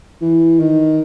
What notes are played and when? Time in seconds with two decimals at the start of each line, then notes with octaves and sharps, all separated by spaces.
0.21 E3
0.59 D#3